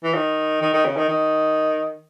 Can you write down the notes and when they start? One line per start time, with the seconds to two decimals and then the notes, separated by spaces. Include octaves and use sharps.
0.04 E3
0.15 D#3
0.62 D#3
0.74 D#3
0.85 C#3
0.97 D#3
1.09 D#3